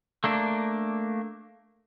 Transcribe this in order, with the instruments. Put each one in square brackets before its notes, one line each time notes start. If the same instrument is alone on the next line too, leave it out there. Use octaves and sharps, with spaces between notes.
[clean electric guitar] A3 A#3 D4